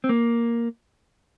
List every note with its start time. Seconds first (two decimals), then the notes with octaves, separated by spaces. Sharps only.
0.04 C4
0.09 A#3